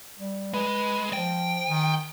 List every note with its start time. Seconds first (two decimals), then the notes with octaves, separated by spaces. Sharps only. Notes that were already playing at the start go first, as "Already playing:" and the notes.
0.18 G3
0.54 G#3 B4
1.13 F3 G5
1.68 D#3